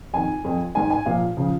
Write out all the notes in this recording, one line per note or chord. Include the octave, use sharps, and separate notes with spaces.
F2 D#3 G#5
F2 F3
G#2 D#3 G#5
G#5
A#2 F3 F5
C#3 F3